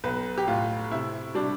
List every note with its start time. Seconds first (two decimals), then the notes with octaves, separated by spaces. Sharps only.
0.04 B1 B4
0.38 G4
0.48 A2 F4
0.91 C3 E4
1.35 G3 D4